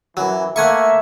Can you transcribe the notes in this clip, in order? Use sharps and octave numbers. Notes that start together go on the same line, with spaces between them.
F#2 E3 F#3
A3 A#3 E5 F#5 G#5 C#6